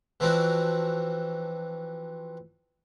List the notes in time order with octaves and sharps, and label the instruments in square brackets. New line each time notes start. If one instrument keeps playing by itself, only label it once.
[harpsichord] E3 F3 C4 D4 F#4